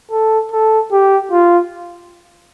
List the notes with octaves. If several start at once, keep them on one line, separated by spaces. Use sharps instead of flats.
A4
A4
G4
F4